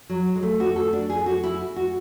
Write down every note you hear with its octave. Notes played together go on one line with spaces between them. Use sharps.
F#3
G#3
A3
F#4
A4
D4
G#4
F#4
E4
F#4